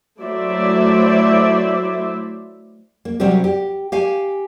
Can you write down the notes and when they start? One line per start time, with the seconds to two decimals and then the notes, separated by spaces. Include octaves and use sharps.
0.22 F#3 A3 E4 C5 D5 E5
3.05 A#3
3.20 C3 F#3 G3 C4 G4
3.44 G4
3.92 G4 F5 G#5